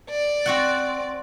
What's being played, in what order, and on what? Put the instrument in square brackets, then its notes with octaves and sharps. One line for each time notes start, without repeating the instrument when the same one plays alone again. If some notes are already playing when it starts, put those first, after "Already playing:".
[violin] D5
[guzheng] C4 F#4 F#5